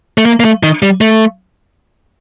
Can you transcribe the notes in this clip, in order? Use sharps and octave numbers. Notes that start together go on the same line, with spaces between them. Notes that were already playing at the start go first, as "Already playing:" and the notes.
A3
A#3
A#3
A3
D#3
G3
A3